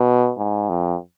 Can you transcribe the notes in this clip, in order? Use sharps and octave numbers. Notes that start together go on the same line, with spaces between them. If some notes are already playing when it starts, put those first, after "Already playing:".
Already playing: B2
G#2
F2